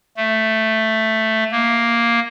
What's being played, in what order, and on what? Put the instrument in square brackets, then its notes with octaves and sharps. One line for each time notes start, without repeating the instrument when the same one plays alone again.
[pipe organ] A3
A#3